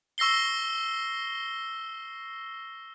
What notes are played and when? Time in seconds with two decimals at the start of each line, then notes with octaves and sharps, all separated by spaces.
0.18 C#6 E6 A#6 C7 G7